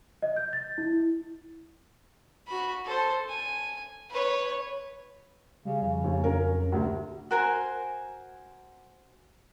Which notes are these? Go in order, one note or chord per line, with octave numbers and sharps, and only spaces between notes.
D#5
G6
A6
E4
F#4 B5
A4 C5
G#5
B4 C#5
C#3 G3
F2 C#3
D#2
F#3 C#4 A#4
D2 C3
F#4 A#4 C5 G#5